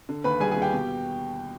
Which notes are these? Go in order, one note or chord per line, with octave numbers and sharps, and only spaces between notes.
D3
D#2 B4 B5
G3 G#4 G#5
G#4 G#5
D#2
G4 G5
B2